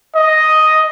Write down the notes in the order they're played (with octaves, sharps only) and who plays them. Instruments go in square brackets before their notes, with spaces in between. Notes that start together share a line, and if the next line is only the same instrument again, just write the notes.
[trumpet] D#5